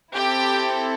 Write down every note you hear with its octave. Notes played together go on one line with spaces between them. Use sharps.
C4 E4 G4 A4 G5